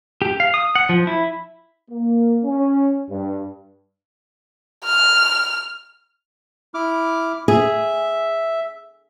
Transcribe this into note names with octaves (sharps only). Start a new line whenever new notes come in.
G4
F5
D#6
F#5
F3
E4
A#3
C#4
G2
F6
E4 D6 F6
G#4 E5